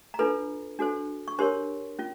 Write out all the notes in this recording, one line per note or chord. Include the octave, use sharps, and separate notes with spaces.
A#5
D4 F4 A4 B4 B5
D4 F#4 A4 C5
C#6
D4 G4 A#4 C5 C#5 C6
C#4 F4